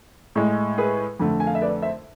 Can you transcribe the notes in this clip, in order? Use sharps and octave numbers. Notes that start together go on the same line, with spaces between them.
A2 G#3
G#4 B4
F2 D3 A3
G#5
F5
E5
B4 D5
C5 E5